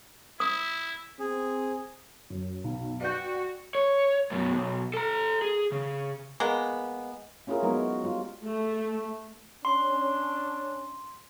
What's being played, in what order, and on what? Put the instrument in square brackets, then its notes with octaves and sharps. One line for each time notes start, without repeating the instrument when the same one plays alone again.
[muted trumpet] E4 [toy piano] D#6
[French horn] C4 [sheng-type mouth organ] G#4
[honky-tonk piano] F#2
B1
[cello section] F#4 [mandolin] B4 G5 [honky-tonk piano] D5
[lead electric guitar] C#5
F#2 B2
B1
A4 A#5
G#4
C#3
[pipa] G#3 A#3 B3
[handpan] A#3 C#4 E4 F4 G#4 A#4
F#3 G#3 B3 D#4 A#4
F#4
G3 F4
[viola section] A3
[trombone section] C#4 D4 [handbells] C6